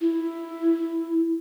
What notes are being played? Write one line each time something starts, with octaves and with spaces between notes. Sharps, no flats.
E4